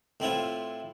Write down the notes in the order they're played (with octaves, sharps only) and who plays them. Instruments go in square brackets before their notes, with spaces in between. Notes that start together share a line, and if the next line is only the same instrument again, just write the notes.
[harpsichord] A2 C4 E4 F4